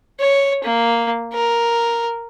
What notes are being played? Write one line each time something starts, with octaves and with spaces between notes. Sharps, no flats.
C#5
A#3
A#4